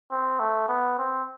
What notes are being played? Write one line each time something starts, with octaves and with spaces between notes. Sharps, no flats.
C4
A3
B3
C4